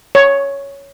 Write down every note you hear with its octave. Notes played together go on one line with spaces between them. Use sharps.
C#5